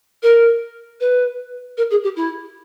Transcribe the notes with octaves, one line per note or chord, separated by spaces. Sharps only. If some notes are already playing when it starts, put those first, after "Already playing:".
A#4
B4
A#4
G#4
G4
E4